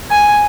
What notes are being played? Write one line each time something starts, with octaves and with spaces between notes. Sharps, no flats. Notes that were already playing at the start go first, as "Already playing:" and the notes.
G#5